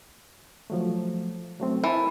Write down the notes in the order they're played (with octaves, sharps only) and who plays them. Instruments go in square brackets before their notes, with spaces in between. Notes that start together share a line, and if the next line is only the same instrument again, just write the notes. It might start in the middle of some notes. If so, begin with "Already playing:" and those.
[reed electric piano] F3 F#3 A3
F#3 A3 C4
[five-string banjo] E3 [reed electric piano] A#4 A5